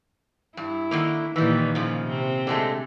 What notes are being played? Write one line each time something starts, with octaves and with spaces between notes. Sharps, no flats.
G2 E4
D3 D#3 A#3
A#2 D#3 E3 G3
C#3 F3
C3 C4
D3 G#3 A3